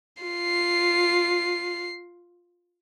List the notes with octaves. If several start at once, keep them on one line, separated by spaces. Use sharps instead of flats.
F4 C7